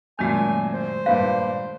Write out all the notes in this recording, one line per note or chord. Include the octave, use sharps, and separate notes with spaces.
F#2 A#2 D#3 F#3 G#3 A3 G#5
C5
G2 A#2 B4 F5